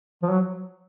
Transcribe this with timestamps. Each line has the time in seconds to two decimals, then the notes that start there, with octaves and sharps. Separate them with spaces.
0.23 F3
0.30 F#3